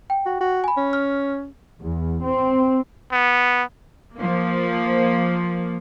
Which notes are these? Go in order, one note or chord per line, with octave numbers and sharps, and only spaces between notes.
G5
F#4
F#4
G#5 B5
C#4
F6
E2
C4
B3
F3 A#3